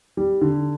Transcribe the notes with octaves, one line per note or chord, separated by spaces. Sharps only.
G3
D3